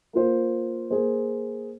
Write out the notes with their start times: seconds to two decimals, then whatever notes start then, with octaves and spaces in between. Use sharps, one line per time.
0.13 A#3 F4 C5
0.90 A#3 G#4 C5